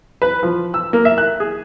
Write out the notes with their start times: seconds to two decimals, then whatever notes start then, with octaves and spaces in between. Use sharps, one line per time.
0.22 B4
0.43 F3
0.74 E6
0.93 A#3
1.05 E5
1.18 F#6
1.40 G#4